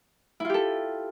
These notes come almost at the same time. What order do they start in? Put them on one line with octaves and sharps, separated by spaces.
E4 F4 G4 A4